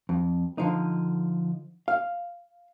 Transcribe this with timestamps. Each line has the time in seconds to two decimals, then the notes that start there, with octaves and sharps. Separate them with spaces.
0.09 F2
0.58 D3 F3 D#4
1.88 F5